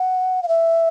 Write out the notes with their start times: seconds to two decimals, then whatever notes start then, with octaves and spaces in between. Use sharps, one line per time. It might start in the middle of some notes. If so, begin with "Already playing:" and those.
Already playing: F#5
0.43 F5
0.48 E5